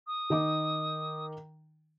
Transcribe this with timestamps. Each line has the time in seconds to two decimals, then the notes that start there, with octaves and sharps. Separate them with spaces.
0.07 D#6
0.30 D#3 D#4 D6